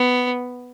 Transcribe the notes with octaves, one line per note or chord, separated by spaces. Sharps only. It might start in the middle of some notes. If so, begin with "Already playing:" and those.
Already playing: B3